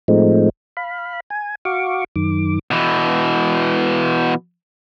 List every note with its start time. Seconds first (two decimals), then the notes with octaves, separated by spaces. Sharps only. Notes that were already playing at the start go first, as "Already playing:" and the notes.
0.08 A2 F3 G#3 A3 C4 D#4
0.77 F5 B5
1.30 G#5
1.65 F#4 F5 C#6 D6
2.16 F#2 D#3 D6
2.71 B2 E3